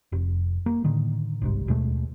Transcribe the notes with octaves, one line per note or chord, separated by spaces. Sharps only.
F1
A#3
A2 D3 D#3
G1 C2 G#2
D#2 B2 G#3 A3